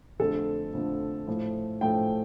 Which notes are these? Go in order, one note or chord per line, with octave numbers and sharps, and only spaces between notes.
F2 D3 F3 A3 A4
F2 D3 F3 A3
A2 F3 A3
A2 F3 A3 G5